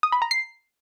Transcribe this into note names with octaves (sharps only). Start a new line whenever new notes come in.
D#6
B5
A#5
C7